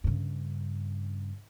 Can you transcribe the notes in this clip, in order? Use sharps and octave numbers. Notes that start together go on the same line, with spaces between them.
G2 C#3